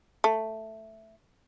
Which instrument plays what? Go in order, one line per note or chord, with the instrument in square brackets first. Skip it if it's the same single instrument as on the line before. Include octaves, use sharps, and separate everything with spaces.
[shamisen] A3